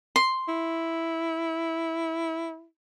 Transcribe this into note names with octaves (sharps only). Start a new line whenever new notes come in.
C6
E4